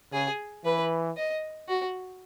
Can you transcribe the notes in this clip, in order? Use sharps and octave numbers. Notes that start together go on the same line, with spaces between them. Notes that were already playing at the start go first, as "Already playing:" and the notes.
C#3 G#4
E3 B4
D#5
F#4